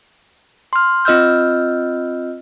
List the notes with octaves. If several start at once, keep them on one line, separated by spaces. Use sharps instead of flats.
C6 F6
C4 F4 D#5 E6 F6 G6